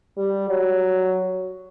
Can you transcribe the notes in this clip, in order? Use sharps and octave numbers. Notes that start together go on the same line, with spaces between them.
G3
F#3